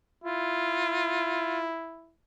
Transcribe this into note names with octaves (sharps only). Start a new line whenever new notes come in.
E4 F4